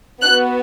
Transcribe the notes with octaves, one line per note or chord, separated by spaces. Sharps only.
B3 F#4 F#6